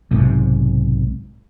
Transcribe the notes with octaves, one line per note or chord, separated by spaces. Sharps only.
B1 G#2 C3